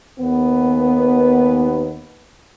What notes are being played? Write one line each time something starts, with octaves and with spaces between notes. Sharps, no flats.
D#2 B3